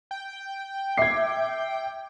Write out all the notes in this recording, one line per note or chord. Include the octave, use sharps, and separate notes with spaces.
G5
E5 D6 G#6 C7